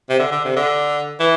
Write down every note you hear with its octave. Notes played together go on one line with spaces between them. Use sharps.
C3
D3
D3
C3
D3
E3